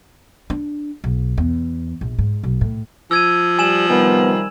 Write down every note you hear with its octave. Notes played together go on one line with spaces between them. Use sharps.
D4
B1
E2
A#1
G#2
B1
A2
F3 E6 G#6 D#7
G3 G#5 E7 F#7
C3 D#3 G3 B3 G#5